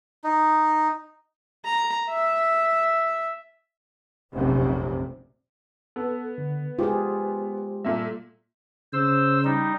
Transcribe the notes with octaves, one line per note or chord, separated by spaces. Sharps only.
D#4
A#5
E5
F1 A#1 F#2 C3
B3 A4
D3
G#3 F4 G4 G#4 C5
A#2 G3 A#3 A4 E5
C#3 C5 E6
G3 D#4